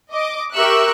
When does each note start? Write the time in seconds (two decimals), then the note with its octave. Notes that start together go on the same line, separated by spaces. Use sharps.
0.13 D#5 D6
0.53 G4 A#4 E5 C#6 E6 F#6